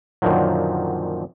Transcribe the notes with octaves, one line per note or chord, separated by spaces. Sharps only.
F#2 A#2 D3 D#3 F3 F#3